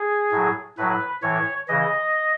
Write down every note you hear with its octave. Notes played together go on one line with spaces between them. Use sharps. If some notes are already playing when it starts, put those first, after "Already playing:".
Already playing: G#4
A2 F#3
A2 F#3 B4
A2 E3 C#5
C#3 E3 D#5